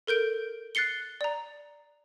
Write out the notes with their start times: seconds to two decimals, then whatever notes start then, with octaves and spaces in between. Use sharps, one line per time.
0.07 A4 A#4 G6 D7
0.75 F#6 A6 C7 C#7 G7
1.21 D5 A#5